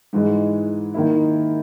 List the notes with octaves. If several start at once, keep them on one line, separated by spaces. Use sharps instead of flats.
G#2 E3 G#3
D#3 A#3 E4